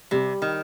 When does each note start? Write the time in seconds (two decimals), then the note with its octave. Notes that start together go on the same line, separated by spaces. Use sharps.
0.11 C3 G3
0.42 D#3